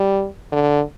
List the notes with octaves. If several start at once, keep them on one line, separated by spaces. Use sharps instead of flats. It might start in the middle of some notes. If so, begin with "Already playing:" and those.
Already playing: G3
D3